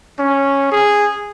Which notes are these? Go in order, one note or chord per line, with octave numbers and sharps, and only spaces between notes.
C#4
G#4